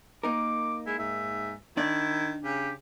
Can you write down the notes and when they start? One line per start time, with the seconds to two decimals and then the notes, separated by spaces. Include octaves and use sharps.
0.23 A#3 D#4 A#4 D6
0.86 G#3 E4
0.99 G#2 E5
1.77 D#3 D4 E4 D5
2.44 C#3 G4